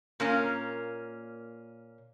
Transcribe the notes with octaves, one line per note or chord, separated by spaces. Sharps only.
A#2 A#3 C#4